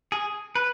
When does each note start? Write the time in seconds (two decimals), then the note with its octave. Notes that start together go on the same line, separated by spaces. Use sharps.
0.12 G#4
0.55 B4